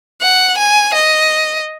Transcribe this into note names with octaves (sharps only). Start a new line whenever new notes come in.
F#5
G#5
D#5